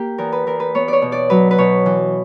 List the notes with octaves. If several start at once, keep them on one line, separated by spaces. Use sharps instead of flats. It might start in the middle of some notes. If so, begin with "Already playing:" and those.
Already playing: A#3 G4
E2 A#4
B4
E2 A#4
B4
B3 C#5
C#5 D5
B2
D5
F#3 B4
B4
B2 C#5
E3